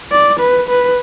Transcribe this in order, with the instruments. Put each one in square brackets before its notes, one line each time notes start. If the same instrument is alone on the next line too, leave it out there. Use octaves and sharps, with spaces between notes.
[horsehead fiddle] D5
B4
B4